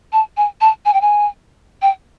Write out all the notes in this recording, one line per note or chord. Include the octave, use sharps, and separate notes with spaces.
A5
G#5
A5
G#5
G5
G#5
G5